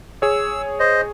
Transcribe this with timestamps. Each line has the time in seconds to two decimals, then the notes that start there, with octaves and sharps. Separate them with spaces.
0.22 G#4 C#5 E6
0.80 C5 D#5